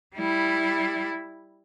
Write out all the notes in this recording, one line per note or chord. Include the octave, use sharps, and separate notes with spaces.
G3 E4